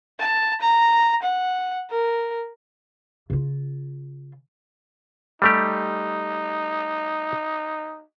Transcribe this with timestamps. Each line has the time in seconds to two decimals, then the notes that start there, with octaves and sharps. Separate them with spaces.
0.19 A5
0.61 A#5
1.22 F#5
1.90 A#4
3.30 C#3 F4
5.42 G3 A3 D#4 G4